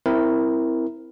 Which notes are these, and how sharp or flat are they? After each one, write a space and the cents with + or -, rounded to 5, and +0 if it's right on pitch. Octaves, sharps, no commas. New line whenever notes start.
C4 -10 E4 +0 A#4 +0